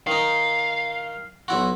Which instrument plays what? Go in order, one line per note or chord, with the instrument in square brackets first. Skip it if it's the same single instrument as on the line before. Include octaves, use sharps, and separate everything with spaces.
[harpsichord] D#3 D#4 [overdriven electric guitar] F5
[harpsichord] B1 E4 F#4